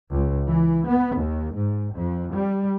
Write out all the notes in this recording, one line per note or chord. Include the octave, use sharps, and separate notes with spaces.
C#2
E3
B3
D#2
G#2
F2
G3